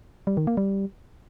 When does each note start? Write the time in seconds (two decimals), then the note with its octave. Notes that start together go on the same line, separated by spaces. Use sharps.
0.27 G3
0.37 D#3
0.47 A#3
0.57 G3